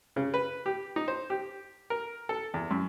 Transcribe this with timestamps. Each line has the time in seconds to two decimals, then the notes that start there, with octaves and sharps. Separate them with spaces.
0.16 C#3
0.34 B4
0.66 G4
0.96 D#4
1.08 C5
1.30 G4
1.90 A#4
2.29 A4
2.54 E2
2.71 F#2